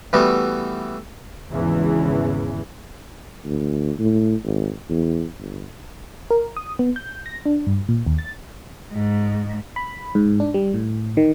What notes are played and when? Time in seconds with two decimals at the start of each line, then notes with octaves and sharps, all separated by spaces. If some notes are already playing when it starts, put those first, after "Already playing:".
0.13 E3 G3 A3 B3 F#4
1.52 G#1 E2 C#3 E3
3.45 D2
3.99 A2
4.44 G#1
4.90 E2
5.38 G1
6.31 A#4
6.57 D#6
6.79 B3
6.96 G6
7.26 A#6
7.46 D4
7.67 G2
7.89 A#2
8.06 D#2
8.19 A6
8.93 G#2
9.76 B5
10.15 G#2
10.40 D4
10.54 G3
10.74 A2
11.17 D#3